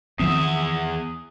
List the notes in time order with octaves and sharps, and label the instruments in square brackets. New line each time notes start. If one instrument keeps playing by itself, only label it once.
[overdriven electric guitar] E2 E5 [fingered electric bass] D#3 F3 C4 [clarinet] D#6